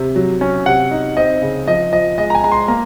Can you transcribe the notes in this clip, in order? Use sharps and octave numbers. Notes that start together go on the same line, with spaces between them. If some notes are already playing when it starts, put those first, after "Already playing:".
Already playing: C3
F#3
C#4
C3 F#5
D#4
C4 D#5
C#3
F3 D#5
F3 D#5
G#3 D#5
A#5
G#5
G#3 A#5
C6
A#3 A#5